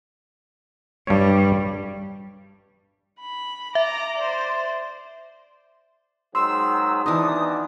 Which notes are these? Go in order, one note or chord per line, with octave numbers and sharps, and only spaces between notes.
G2 G3 C#5
B5
E5 A#5 D6
C5 D5
G#2 D#3 F#3 C6 E6
B2 D#3 E3 D4 D#4 D#6